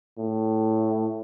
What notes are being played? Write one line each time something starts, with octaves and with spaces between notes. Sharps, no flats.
A2